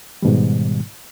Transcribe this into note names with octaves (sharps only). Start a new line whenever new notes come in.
G#2 B2 D#3 G3